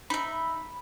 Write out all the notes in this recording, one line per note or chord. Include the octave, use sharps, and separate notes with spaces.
D#4 E5 B5